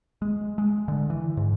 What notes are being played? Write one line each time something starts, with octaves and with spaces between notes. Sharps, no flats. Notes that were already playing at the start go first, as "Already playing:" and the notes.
G#3
G#3
D3
E3
G#2